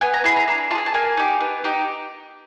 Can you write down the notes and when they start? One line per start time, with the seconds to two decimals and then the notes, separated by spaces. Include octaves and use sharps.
0.01 B3 G#5
0.14 A#5
0.24 E4 G#4 B5
0.36 A#5
0.48 D4 A#5
0.71 F4 A5
0.75 G#4 G#5
0.86 A5
0.94 A#3 G#5
1.17 D#4 G4
1.40 B3
1.64 D#4 G4